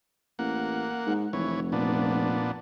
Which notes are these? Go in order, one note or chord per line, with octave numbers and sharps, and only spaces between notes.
A1 A#3 F#5
G#2
F1 E3 C#5
A#2 B3 D4